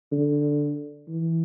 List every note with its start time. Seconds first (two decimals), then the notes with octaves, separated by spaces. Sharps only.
0.12 D3
1.08 E3